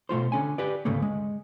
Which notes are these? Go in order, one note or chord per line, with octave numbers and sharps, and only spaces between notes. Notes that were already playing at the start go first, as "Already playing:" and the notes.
B2 A3 F4 C5
D3 C#4 G#5
G4 B4 D5
D2 G#2 C#3 A3 A#3
G#3